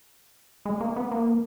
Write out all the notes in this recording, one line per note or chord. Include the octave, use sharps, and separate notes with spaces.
G#3
A#3
B3
A#3